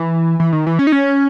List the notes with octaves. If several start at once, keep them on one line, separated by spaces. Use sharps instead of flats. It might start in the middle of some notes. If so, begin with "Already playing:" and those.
Already playing: E3
E3
D#3
E3
C#4
D#4
C#4